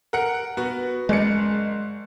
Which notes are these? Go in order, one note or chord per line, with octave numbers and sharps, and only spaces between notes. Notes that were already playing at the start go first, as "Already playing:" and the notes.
A#4 F#5 C#7
B3 F#4
F#1 G#3 D5 C#7